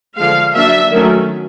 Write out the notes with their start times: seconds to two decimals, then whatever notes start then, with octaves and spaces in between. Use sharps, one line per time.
0.17 D3 F3 G#3 F5
0.54 F#3 A#3 D4 E5
0.91 D#3 F#3 A3 C#4